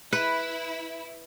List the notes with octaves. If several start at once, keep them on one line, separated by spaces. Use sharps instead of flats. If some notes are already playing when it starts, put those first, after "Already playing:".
E4 B4